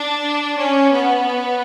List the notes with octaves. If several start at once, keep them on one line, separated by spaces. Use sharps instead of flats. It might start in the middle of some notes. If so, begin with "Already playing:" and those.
Already playing: D4
C#4
B3